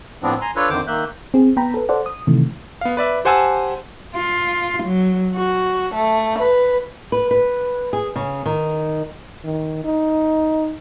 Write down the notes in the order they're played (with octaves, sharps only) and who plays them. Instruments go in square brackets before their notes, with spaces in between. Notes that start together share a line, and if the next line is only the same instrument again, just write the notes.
[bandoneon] A2 F3 B3 C4 D4
G#5 A#5 C6
D4 F4 A4 B4 C#5
F2 D3 D#3 C5 D6
D#3 A#3 E5 F#6 G6
[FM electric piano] C4 G#4
B3 G5 A#5 B5
A4 B4
A4 C5 D5 F#5
D#6
C3 D#3 E3 A3
[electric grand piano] B3 F5
B4 D5 E5
G4 C5 F#5 G#5 A5 E6
[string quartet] F4
F#3
F#4
A3
B4
[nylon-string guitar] B4
B4
G#4
C#3
D#3
[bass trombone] D#3
D#4